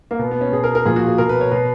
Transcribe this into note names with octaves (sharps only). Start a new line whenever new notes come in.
A#3
B2 B3
B3
C#4
B2 G#4
A#4
A#4
A#2 F3 G#4
F#4
G#4
B2 A#4
B4
C#5
B2 B4